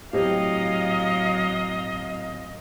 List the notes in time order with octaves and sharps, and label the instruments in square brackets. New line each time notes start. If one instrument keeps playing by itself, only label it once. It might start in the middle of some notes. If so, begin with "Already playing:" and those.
[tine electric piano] A2 C4 [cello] F#3 F5 [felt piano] G4 [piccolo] D#5